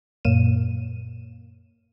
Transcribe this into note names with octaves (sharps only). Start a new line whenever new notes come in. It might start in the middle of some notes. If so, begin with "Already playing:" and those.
F#2 A#2 A#3 D#7 E7